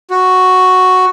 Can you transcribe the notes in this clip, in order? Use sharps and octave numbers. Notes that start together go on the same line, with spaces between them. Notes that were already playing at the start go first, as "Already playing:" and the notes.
F#4